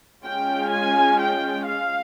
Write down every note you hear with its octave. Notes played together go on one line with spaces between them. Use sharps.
G#3 C#4 F4 G5
G#5
G5
F5